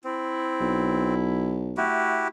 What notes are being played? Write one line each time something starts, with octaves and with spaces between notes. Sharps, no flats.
C4 E4
B1
A3 E4 F#4 G4